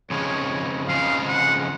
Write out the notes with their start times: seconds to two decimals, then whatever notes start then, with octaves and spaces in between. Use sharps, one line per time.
0.10 F2 C#3 F3 G#3 C#5
0.88 F2 C#3 F3 G#3 F5
1.28 F#5